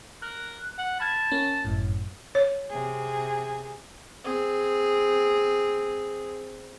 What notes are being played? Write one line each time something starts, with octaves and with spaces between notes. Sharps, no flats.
A#4 F#6
F#5
A5 B5 F6 G#6
A#3 C#4
G1 F#2 A2
C#5
C3 G#4
C4 G#4